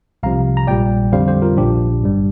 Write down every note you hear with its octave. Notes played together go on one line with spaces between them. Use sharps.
C2 C3 F3 F5 A#5
A#5
A#1 A#2 G3 D5 G5
F2 D3 G3 C5 F5
G4 C5
F4 A#4
A#1 A#2 F3 D4 G4
G1 G2 G3